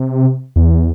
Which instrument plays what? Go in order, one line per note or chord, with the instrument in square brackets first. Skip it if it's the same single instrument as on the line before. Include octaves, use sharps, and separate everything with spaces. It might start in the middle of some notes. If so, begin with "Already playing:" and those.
Already playing: [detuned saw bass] C3
E2